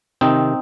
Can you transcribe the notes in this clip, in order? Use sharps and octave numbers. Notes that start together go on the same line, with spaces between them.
C3 D#3 C4 D#4